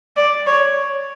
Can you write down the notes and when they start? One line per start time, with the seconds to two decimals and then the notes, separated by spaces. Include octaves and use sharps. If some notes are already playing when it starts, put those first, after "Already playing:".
0.17 D5
0.47 C#5